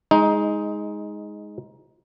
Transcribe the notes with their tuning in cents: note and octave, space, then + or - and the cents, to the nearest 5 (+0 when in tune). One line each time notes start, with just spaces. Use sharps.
G#3 +0 D#4 +15